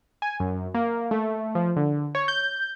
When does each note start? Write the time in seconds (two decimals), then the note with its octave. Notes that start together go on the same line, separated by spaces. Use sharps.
0.22 G#5
0.40 F#2
0.74 A#3
1.11 A3
1.55 F3
1.76 D3
2.15 C#5
2.28 G6